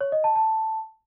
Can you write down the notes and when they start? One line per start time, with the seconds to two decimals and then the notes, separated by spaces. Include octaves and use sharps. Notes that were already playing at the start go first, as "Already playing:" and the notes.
0.01 C#5
0.12 D#5
0.24 A5
0.36 A5